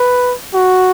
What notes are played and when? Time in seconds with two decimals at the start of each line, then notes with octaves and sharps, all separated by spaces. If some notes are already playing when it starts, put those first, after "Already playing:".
Already playing: B4
0.54 F#4